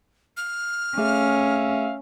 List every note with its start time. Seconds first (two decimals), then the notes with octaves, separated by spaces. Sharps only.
0.37 F6
0.98 A3 C#4 G#4 E5 F5